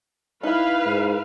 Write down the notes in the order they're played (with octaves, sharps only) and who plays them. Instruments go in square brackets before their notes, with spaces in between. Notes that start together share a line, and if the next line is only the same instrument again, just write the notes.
[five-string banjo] D#4 E4 [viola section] B4 F5
[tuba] G#2